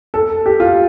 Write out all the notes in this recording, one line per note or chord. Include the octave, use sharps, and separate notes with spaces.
A4
G4
F4